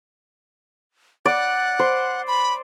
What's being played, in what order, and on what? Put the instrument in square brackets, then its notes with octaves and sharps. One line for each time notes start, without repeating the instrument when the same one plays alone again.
[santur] D5 [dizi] F#5
[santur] C5
[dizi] B5